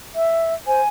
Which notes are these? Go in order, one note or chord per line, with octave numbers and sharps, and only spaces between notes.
E5
C5 G#5